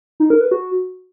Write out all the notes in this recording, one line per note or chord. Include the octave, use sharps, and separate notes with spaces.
D#4
A#4
B4
F#4